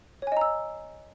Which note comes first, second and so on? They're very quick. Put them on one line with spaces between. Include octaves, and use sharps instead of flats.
C#5 G#5 D#5 A#5 E6